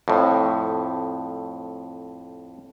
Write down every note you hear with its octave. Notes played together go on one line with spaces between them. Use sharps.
F2 A2